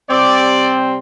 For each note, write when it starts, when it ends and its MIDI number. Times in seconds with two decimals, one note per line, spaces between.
0.10 0.96 48
0.10 0.96 55
0.10 0.96 60
0.10 0.78 74